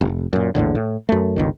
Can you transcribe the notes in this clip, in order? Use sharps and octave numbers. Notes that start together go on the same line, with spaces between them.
F1
F#2 A#2
A#1 E2 A2 D3
A2
F#2 A3
G1 C#2 D#3